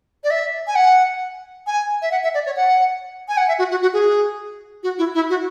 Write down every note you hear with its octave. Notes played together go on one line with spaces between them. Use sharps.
D5
E5
G#5
F#5
G#5
E5
F#5
E5
D5
C#5
F#5
G#5
F#5
E5
F#4
F#4
F#4
G#4
F#4
E4
E4
F#4